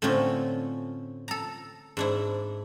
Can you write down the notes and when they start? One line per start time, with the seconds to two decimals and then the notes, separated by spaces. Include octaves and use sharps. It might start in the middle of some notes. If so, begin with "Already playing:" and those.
0.02 A2 D3 A3 C4 C#4 F4
1.28 A4 A#5
1.97 G#2 D4 E4